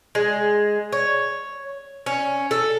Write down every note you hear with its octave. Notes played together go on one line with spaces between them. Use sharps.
G#3
C#5
C#4
A4